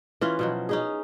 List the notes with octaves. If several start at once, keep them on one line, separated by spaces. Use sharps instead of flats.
E3 C#4 F4
B2 F3 F#3
C#4 D#4 G#4